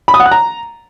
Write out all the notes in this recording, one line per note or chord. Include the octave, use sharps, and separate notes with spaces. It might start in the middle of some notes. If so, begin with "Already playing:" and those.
B5
D#6
F#5
F#6
A#5